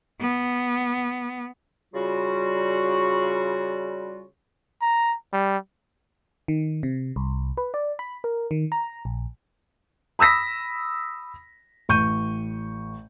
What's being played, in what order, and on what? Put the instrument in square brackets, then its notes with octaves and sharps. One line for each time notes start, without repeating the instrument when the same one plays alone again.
[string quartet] B3
[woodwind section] C#3 G3 F4 F#4
[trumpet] A#5
G3
[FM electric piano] D#3
C3
C2
B4
D5
B5
A#4
D#3
A#5
A#1
[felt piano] B5 D#6 E6 A#6 B6
A1 C#6 G6 D#7